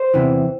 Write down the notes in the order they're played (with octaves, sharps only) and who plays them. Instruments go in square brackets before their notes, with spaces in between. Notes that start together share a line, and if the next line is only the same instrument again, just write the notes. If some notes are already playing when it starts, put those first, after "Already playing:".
Already playing: [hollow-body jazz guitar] C5
E2 C3 E3